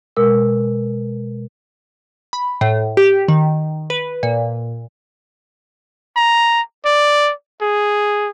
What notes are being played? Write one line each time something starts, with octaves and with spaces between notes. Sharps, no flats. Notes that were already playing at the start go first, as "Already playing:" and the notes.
B2 G#3 A#4 E6
B5
A2
G4
D#3
B4
A#2
A#5
D5
G#4